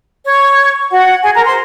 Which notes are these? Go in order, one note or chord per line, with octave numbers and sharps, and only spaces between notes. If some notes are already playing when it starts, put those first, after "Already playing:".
C#5 C#6
F#4 F#5
G#4 G#5
A#4 A#5
C5 C6